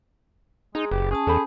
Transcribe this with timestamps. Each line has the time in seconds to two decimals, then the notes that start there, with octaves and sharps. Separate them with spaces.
0.75 G#3 D#4 G#4 A#5
0.91 F#1 G4 B4
1.11 C#4 G#4 A5
1.27 E2 A4 C5 B5